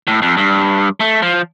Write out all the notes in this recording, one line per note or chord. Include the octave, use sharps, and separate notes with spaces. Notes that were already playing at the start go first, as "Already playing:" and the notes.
A2
F2
G2
A3
F3